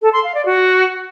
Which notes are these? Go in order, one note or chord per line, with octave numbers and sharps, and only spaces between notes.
A4
C6
F5
D5
F#4